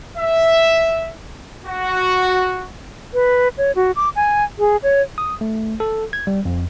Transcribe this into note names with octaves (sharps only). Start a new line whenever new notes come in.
E5
F#4
B4
C#5
F#4
D6
G#5
G#4
C#5
D#6
A3
A4
G#6
G3
F2